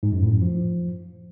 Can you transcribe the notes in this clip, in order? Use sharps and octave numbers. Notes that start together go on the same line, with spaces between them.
G#2
F#2
A2
F#2
F3